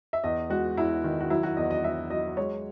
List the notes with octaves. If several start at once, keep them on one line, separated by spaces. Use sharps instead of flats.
E5
E2 D#5
G#3 F#4
E2 E4
D#3
F#4
F#3 E4
F#4
E2 D#5
D#5
F#3 E5
F#3 D#5
G#3 C#5